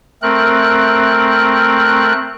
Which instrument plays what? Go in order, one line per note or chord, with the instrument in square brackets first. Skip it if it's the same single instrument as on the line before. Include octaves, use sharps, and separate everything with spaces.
[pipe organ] A3 C4 A#4 F#6